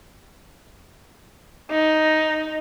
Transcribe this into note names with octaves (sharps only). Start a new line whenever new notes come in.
D#4